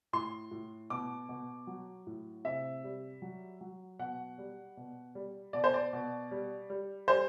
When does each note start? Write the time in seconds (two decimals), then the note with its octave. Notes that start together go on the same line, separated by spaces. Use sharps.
0.13 A2 C6
0.51 A2
0.90 B2 D6
1.29 B2
1.67 F#3
2.07 A2
2.44 C3 E5
2.84 G3
3.22 F#3
3.61 F#3
3.99 B2 F#5
4.38 G3
4.77 B2
5.15 G3
5.53 B2 D5
5.64 C5
5.74 D5
5.93 B2
6.31 G3
6.70 G3
7.08 G3 C5